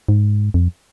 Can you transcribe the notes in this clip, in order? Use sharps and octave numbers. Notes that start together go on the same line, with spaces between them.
G#2
F2